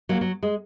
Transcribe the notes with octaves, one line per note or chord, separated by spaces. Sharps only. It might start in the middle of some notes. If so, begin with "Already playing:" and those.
F#3 A#3
F#3
G#3